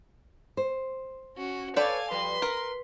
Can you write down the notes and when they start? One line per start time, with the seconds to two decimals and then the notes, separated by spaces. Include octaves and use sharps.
0.57 C5
1.37 C#4 F#4
1.76 A4 B4 C#5 D5 F5 G5 G#5
2.11 F3 G3 B4 C6
2.42 A#4 B4